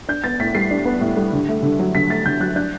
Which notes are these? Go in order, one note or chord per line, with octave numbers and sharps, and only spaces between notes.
D4 G6
B3 A6
A2 B6
G3 C7
D4
B3
A2
G3
D3
A3
D3
F#3
D3 B6
A3 A6
D3 G6
F#3 F#6
D4 G6